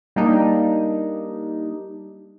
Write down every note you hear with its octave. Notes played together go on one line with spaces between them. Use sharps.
G3 A#3 D4 D#4